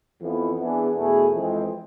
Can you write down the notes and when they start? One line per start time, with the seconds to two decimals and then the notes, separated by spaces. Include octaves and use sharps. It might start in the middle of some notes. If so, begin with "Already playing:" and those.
0.22 F2 E3 B3
0.59 E3 B3 D4 G#4
0.96 E2 B2 A3 E4 G#4
1.33 F2 E3 G#3 C4